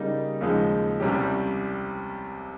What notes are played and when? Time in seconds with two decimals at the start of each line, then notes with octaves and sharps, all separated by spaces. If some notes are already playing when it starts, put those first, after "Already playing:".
Already playing: C#3 G3 A#3 D#4
0.41 D#2 C#3 F3 G#3 D#4
1.00 C2 C3 G3 C#4 G4